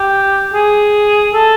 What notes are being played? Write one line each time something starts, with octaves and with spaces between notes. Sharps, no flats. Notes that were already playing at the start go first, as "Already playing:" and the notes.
Already playing: G4
G#4
A4